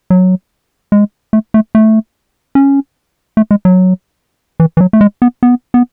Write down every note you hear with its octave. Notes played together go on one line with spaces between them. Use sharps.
F#3
G#3
A3
A3
A3
C#4
A3
G#3
F#3
E3
E3
F#3
A3
G#3
B3
B3
B3